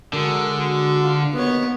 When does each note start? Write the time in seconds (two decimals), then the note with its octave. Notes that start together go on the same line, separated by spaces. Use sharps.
0.13 D3 G#3 F#4 A#4
0.59 F#4
1.02 F4
1.32 D#2 B2 B3 C#5